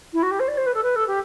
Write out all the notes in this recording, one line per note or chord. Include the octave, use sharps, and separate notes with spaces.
E4
F#4
G4
C5
D5
C5
B4
A4
B4
A4
G4